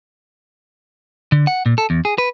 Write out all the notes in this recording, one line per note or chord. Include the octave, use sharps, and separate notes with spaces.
D3
F#5
A#2
A4
E2
G#4
B4